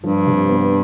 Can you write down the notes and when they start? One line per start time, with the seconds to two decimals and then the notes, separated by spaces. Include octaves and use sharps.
0.03 G2 F3
0.26 C3
0.49 B3